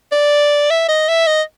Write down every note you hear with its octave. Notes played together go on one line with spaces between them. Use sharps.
D5
E5
D#5
E5
D#5